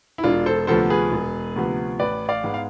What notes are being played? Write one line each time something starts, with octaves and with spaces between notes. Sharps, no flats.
E4
E1 D4 F4
A4 C5
D2 C3 F3 B3 A4 C5
G#4 B4
E1
D2 C3 F3 B3
A1 B4 D5
D5 F5
G#2 G#3 B3
F5